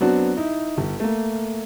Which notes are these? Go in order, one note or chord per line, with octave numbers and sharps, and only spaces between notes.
F#3 B3 C4 D4 F#4
D#4 E4
G1
A3 A#3